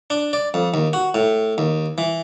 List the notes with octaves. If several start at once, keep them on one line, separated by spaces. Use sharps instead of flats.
D4
D5
F2
D#2
F#4
A2
D#2
E3